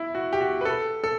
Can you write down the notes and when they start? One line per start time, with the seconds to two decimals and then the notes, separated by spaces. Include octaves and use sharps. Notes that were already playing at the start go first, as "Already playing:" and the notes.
Already playing: E4
0.15 F#4
0.33 G4
0.41 F#4
0.61 B4
0.65 A4
1.04 A4